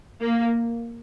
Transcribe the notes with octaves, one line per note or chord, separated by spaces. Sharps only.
A#3